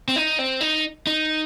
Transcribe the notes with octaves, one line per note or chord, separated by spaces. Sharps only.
C4
D#4
C4
D#4
D#4